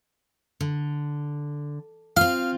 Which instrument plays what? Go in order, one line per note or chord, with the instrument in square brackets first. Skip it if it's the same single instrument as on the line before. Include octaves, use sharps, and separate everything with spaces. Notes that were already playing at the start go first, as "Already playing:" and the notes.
[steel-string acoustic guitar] D3
[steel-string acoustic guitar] C4 F4 [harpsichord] F5